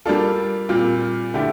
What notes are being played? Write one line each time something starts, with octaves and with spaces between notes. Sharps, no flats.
G3 A#3 D4 F4 A4
A#2 G3 C4 F4
D3 A3 E4 G4